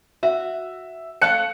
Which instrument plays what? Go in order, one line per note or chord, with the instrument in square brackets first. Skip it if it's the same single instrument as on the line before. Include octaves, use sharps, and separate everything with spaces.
[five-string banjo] F#4 [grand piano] E5
[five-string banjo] A3 F5 A5 [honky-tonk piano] F#6 C#7